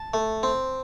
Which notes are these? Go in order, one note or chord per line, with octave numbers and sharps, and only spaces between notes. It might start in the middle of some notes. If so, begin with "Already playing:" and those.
Already playing: A5
A3
C4